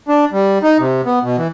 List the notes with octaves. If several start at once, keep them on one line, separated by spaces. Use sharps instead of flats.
D4
G3
D#4
C3
B3
B2
E3